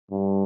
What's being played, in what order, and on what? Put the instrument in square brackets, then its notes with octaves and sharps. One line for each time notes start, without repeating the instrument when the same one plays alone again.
[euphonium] G2